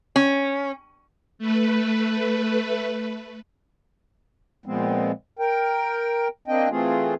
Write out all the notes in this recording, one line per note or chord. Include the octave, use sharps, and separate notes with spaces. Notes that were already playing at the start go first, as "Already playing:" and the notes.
C#4
A3 B4
A#2 F3 G#3 B3 C4
A#4 G5
A#3 C4 D4 D#5 G5
E3 A3 C4 F4 G#4